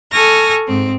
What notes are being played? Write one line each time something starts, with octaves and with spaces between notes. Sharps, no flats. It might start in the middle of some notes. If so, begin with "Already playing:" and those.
A4 G#5 C#6 F6 A#6
G#2 C4